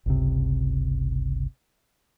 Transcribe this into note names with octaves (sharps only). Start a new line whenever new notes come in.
G1 C#2 C3